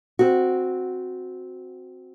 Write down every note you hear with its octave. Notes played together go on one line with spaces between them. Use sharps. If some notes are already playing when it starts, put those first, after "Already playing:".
C4 F#4